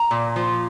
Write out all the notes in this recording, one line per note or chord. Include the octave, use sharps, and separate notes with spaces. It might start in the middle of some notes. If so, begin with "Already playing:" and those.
Already playing: A#5
A#2
F3